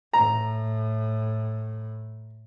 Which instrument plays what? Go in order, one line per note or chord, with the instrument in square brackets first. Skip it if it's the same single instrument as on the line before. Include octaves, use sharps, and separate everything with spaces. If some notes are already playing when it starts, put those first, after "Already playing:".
[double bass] A2 [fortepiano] A#5